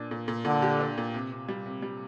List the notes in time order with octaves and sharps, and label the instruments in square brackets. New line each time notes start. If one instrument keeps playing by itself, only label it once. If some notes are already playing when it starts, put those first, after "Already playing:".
Already playing: [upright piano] A#2 D4
A#2
A#2
[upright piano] A#2 [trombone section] D3
[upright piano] G4
D4
A#2
C3
C3
G3
C3
G3